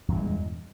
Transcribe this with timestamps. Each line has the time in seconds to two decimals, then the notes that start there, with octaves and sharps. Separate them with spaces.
0.08 E2
0.11 G2
0.15 A#2
0.18 G#3